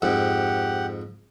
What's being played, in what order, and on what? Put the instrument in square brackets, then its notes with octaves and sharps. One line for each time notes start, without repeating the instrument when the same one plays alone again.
[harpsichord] F2 G#2 [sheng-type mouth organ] G4 F#5